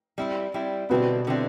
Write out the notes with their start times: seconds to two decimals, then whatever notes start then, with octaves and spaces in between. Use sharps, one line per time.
0.18 G3 C4 E4
0.54 G3 C4 E4
0.90 B2 D3 G3 B3 C4 E4
1.27 D3 G3 C4 E4